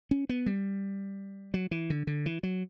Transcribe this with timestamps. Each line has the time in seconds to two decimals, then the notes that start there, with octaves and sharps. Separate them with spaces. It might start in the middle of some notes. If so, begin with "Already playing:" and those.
0.11 C#4
0.29 B3
0.46 G3
1.54 F#3
1.71 E3
1.90 D3
2.07 D3
2.26 E3
2.43 F#3